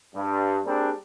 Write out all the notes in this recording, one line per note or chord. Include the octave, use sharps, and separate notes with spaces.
G2
G3 A#3 C4 D4 G#4